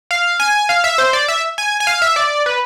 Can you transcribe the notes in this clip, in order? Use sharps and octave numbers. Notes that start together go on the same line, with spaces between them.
F5
G#5
F5
E5
C5
D5
E5
G#5
G#5
F5
E5
D5
B4